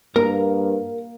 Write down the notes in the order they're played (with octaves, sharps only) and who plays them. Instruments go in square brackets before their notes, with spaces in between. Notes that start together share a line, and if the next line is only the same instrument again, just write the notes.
[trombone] G2 [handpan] A#3 [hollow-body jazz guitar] A#4 A#5